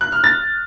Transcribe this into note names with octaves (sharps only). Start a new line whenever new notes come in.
F#6
F6
A6